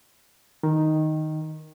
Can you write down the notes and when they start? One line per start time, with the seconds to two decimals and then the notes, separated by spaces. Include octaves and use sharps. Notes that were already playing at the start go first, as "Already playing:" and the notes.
0.63 D#3